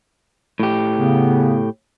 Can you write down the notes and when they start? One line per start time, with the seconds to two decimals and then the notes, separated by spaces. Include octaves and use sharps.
0.60 A2 G4
0.98 C#3 B3